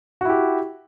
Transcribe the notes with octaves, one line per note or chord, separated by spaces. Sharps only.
E4 F#4 G4